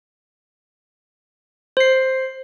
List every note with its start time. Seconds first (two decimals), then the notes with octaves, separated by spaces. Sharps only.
1.77 C5 C7